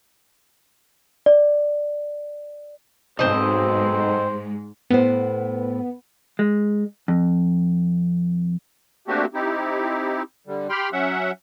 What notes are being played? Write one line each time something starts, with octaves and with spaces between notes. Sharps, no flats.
D5
B1 G#2 G#3 C4 C5 D#5
A2 B3 C5
G#3
F2
A3 A#3 C4 D4 F#4 G4
C4 D#4 E4 G4
D3 G3
G4 G5 B5 C6 F6
F#3 C#4 E5 F#5